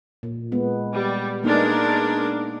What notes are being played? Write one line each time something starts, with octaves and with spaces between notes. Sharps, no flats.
A#2
G#3 B3
G3
G#3 A#3 B3 D4 D#4 A#4